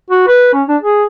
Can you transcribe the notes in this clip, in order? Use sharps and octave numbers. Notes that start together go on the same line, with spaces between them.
F#4
B4
C#4
D4
G#4